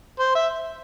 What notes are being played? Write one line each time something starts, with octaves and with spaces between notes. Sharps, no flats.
C5
E5